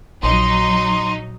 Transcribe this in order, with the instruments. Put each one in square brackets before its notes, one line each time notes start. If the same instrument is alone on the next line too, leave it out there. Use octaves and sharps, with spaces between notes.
[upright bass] A#1 [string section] F#3 D#4 [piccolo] C6